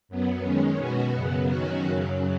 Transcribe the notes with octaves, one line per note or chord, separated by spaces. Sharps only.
F#2 F#3 B3
D#3 G#3 C#4
B2 B3 F#4
F#2 C#3 F#3 B3
D#3 F#3 C#4 F#4
F#2 C#3 F#3